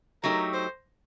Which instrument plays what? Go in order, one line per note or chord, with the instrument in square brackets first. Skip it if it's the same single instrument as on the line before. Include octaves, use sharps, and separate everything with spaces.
[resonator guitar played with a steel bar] F#3 A3 D#4 G4 [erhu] A#4
[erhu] C5